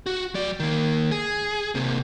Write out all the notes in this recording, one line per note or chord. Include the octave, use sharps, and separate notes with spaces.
F#4
F#3 D5
D#3 A#3
G#4
C3 A#3